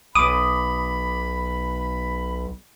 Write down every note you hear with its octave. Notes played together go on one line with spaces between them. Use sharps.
B1 B5 D6 D#6